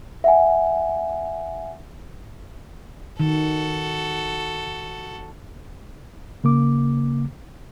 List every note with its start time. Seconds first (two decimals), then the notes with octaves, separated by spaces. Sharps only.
0.24 E5 F#5 G#5
3.20 D#3 F#4 A4
6.44 C#3 A#3 D6